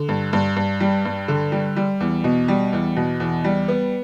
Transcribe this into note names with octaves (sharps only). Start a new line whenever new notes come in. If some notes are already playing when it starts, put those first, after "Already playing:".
Already playing: D3
G2
G2
G2
G3
G2
D3
G3
G3
E2
B2
G3
E2
B2
E2
G3
B3